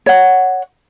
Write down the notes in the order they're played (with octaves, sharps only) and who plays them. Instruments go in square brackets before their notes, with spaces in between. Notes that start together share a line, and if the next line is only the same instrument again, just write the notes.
[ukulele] C#5 F#5